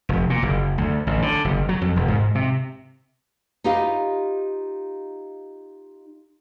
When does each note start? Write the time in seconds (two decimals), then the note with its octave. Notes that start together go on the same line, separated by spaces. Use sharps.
0.09 F1
0.30 A#2
0.43 F#1
0.78 D2
1.07 A1
1.22 D3
1.45 F#1
1.69 F#3
1.82 F2
1.96 E1
2.08 G#2
2.35 C3
3.64 D#4 F4 G4 B4 D#5 F5